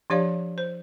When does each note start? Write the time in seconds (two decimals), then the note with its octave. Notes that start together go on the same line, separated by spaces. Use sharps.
0.10 F3 D4 G4 C#5 D5 F5
0.58 C5